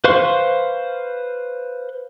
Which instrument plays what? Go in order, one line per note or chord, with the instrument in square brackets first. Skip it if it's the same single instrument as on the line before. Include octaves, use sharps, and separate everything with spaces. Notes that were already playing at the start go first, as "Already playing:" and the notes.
[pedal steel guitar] B4 C5 F5 C6 C#6